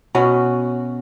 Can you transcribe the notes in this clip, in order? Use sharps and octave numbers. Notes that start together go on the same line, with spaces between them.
B2 C#4 F#4